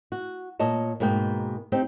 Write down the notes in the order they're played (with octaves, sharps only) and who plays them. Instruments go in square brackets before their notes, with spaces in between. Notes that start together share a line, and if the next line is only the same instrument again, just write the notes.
[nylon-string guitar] F#4
A#2 C#5 D#5 A5
G#2 B2 A#3 G5
C4 D#4 G4